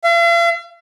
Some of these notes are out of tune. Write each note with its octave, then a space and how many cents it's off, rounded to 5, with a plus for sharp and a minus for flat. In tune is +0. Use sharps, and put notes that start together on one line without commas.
F5 -45